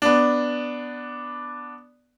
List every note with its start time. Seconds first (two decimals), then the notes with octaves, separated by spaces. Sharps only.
0.02 B3 D4